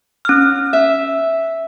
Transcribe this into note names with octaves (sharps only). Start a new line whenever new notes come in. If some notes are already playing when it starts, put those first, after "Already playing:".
C#4 F6
E5